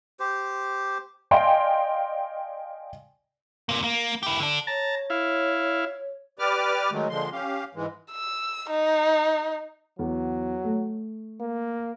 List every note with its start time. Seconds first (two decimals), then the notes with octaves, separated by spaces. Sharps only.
0.20 G4 C5
1.31 D5 D#5 F5 G5 G#5 C6
3.69 C3 A#3
3.84 A#3
4.23 E4 G4
4.40 D3 D4
4.67 C#5 A5 A#5
5.10 E4 F5
6.39 G4 B4 D5 D6 F6
6.91 D#3 F#3 G#3 A3
7.10 A#2 D3 F3 G#3 C6
7.32 C#4 G4 F5
7.75 G#2 E3 G#3
8.12 E6
8.70 D#4
9.99 E2 F#3
10.65 A3
11.41 A#3